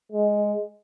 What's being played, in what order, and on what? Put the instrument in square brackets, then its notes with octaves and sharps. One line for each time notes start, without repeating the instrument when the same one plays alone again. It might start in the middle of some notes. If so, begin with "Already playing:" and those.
[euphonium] G#3